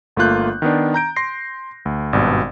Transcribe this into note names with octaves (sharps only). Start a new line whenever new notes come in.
G1 A3 A#3 F4 F#6 G6
D#3 B3 D4
A#5 G6 D7
C6 A#6 C7
D2
G#1 G2 B2